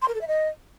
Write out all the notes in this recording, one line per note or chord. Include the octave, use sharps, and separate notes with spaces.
C6
A#4
A4
E5
D#5